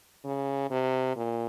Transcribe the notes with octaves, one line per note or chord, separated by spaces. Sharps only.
C#3
C3
A#2